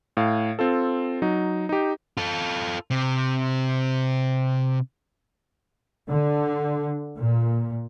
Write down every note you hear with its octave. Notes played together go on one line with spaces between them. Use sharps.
A2 F5
C4 F4 A4
F#3 D#4
D#4 G4
F4 A4
C3
D3
A#2